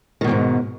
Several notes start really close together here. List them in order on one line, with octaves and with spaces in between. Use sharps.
D#3 B2 E2 G#2